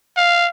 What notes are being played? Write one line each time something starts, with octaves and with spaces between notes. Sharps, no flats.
F5